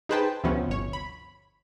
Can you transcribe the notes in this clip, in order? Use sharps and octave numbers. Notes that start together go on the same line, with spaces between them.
D#4 G#4 B4 C5 G5 A5
D2 C3 F3 B3 C#4
G1 C#5
B5